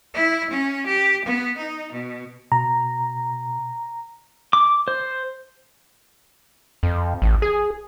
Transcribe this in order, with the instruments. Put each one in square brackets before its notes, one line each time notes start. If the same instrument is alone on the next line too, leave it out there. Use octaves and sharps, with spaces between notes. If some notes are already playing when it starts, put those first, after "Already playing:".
[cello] E4
C#4
G4
B3
D#4
B2
[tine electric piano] B2 [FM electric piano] A#5
[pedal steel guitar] D6
C5
[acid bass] F2
A1
G#4